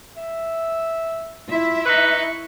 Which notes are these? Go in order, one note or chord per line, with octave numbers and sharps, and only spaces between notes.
E5
E4 F4 E5
D#4 B4 C#6